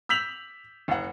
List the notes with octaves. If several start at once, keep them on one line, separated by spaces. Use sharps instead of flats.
E6 G6 B6 F7 F#7
F#1 F#5